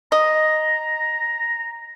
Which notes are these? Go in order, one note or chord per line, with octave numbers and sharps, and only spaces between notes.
D#5 A#5